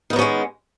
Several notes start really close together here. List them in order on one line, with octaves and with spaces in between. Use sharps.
D#3 B3 F#3 C#4 G#3